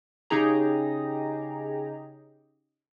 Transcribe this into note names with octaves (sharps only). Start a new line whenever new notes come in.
C#3 D#4 G4 G#4 A#5